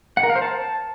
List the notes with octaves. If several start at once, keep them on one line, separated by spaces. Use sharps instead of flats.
F#5
A#4
F5
C5
A5